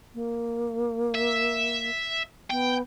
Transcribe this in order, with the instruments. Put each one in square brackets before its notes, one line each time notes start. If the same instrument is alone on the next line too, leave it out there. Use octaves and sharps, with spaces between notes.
[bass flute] A#3
[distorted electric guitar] E5
[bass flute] B3 [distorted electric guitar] G5